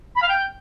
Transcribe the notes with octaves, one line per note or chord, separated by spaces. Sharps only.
B5
F5
G5